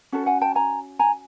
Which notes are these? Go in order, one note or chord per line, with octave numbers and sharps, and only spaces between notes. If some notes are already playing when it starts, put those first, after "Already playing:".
C#4 F#4 A4
F#5 G#5
G5 A5
G#5 A#5
G#5 A#5